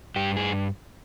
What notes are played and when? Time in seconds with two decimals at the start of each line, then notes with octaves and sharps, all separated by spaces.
0.16 G2 G4
0.37 G#4